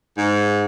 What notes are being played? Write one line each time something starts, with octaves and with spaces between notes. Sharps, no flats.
G#2